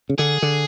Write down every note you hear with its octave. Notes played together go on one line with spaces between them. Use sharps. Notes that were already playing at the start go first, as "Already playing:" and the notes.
C#3
D3 G#4
D3